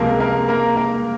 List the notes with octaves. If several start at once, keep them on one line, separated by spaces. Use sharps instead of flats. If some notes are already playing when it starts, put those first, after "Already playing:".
Already playing: C#2 C3 F3 G#3 A#3 A#4
A#3 A#4
A#3 A#4
A#3 A#4